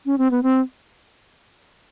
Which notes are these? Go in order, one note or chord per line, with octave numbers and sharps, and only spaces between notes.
C#4
C4
B3
C4